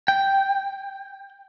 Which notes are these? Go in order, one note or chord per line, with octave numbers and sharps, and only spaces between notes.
G5